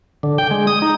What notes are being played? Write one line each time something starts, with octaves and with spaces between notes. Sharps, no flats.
D3
G5
G#3
D#6
D#4